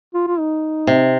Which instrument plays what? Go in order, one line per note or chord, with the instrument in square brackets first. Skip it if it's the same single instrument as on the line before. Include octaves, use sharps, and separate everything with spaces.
[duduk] F4
F4
D#4
[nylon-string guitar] C3